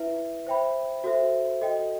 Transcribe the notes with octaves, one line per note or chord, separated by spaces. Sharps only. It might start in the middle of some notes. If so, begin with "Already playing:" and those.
Already playing: E4 B4 E5
C5 E5 G5 B5
F#4 A4 C5 E5
F#4 A4 D#5 G5